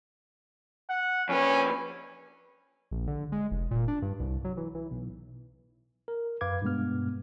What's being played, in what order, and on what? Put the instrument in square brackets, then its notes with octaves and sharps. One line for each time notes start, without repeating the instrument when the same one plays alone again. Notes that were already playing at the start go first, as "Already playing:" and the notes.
[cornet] F#5
[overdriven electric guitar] F2 B4 [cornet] C#4
[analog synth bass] A#1
D3
G#3
F1
A#2
D4
G2
C2
F#3
E3
E3
B1
[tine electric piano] A#4
F#2 B4 F5 D6 G#6
G2 B2 G#3 B3 F6